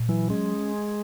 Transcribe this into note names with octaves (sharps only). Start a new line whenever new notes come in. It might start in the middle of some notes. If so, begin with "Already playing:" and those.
Already playing: A#2
E3 F#3
G#3 C#4